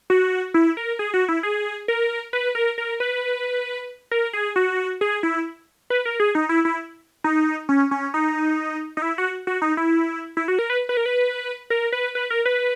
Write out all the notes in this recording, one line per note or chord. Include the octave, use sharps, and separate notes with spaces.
F#4
E4
A#4
G#4
F#4
E4
G#4
A#4
B4
A#4
A#4
B4
A#4
G#4
F#4
G#4
E4
B4
A#4
G#4
D#4
E4
E4
D#4
C#4
C#4
D#4
D#4
E4
F#4
F#4
D#4
E4
E4
F#4
A#4
B4
B4
A#4
B4
A#4
B4
B4
A#4
B4